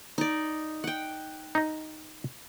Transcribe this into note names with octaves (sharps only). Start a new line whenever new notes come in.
D#4 D5
F#5 G5
D#4 D#5